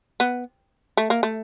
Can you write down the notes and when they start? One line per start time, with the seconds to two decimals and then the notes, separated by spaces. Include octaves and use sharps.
0.20 B3
0.97 A3
1.10 A#3
1.23 A3